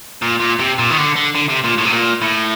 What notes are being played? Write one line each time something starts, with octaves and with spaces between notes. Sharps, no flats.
A#2
A#2
C3
A#2
D#3
D3
D3
D3
C3
A#2
A2
C3
A#2
A2